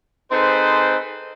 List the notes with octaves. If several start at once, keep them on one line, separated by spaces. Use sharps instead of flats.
C4 D#4 G#4 A4 B4 C5